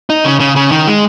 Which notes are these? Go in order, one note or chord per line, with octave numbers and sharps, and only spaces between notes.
D#4
C#3
C#3
C#3
D#3
G#3